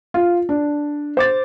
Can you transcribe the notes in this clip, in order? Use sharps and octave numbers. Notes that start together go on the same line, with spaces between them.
F4
D4
C5 D6 A6